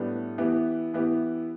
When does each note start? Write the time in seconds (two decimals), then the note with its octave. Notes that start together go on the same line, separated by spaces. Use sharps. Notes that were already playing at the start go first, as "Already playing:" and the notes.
Already playing: A2 G3 B3 D4
0.38 E3 B3 E4 G4
0.94 E3 B3 E4 G4